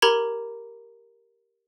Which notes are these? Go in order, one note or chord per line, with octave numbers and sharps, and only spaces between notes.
G4 A#4 A#5 B5 G#6 F#7